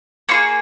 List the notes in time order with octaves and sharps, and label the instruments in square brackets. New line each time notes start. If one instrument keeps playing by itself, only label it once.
[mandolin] A#3 F4 G#4 C#6